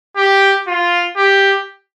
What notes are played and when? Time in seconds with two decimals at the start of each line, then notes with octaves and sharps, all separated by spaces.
0.17 G4
0.68 F4
1.17 G4